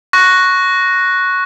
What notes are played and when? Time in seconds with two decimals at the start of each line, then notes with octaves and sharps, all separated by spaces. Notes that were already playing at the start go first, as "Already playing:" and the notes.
0.13 C#6 F#6 A#6